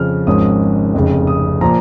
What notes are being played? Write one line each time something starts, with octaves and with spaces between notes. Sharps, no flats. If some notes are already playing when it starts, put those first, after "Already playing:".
Already playing: F2 C#3 F3 F6
G#1 G#2 F3 C#4 D#6
F1 F2 C#3
D#6
A#2 F3 A#5